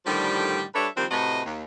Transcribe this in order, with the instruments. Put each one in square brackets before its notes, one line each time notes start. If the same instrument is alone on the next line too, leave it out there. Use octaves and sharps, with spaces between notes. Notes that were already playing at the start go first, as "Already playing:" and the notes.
[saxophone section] A2 D3 D#3 F3 G3
G3 D4 A4 B4 C#5 E5
D#3 F3 G3 A#3 C4 D4
A2 C3 A3 F#4 B4 D#5
D#2